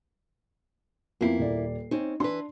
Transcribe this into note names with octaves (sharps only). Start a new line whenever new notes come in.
F2 A#3 B3 E4 C7
D#1 D5
C4 C#4 D#4
E3 D4 B4 C6